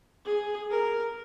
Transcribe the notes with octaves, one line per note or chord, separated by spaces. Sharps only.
G#4
A#4